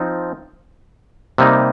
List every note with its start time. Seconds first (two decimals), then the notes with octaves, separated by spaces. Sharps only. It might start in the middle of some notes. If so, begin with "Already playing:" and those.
Already playing: F3 C4 D#4
1.38 C3 G3 A#3 D#4